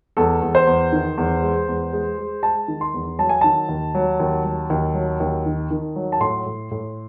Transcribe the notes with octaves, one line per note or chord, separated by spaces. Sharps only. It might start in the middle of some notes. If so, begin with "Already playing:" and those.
E2 A4
E2
C5
E2
D#3
E2
G#3
E2
G#3
G#3
G#3 A5
D#3
C6
E2
F#3 A5
G#5
D#3 A5
D#2
F#3
D#2
F#3
D#2
F#3
D#2
D#3
D#3
F#3
A5
A2 C6
A2
A2